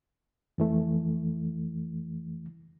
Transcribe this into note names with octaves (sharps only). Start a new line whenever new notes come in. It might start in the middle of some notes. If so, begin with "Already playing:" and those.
F2 E3 A3